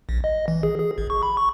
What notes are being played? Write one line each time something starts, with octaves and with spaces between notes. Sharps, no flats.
A#1
D#5
D#5
E3
G#4
G#4
G#1
C#6
B5
C#6